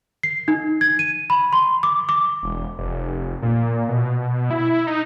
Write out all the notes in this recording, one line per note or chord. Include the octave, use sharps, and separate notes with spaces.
C7
D#4
G#6
D#7
B5
C6
D6
D6
E1
F1
A#2
B2
E4
D#4